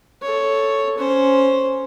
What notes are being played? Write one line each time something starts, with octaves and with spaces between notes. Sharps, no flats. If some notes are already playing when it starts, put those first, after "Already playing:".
A4 C#5
C#4 C5